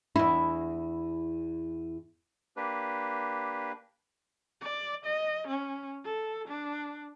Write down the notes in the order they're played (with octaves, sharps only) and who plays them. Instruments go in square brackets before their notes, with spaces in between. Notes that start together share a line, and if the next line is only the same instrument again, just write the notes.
[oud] E2 E4
[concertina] A#3 D4 G4 B4
[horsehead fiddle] D5
D#5
C#4
A4
D4